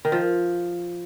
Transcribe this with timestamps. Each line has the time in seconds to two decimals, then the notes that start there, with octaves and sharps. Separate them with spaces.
0.05 D#3
0.12 F3